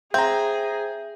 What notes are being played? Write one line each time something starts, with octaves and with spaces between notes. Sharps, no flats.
C4 G#4 E5 A#5 G6